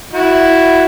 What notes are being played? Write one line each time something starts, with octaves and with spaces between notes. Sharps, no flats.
E4 F#4